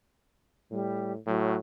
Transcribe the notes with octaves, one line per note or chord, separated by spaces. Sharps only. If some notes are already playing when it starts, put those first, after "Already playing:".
A2 G3
A2 F#3